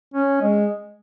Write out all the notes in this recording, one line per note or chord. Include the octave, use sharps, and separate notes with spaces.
C#4
G#3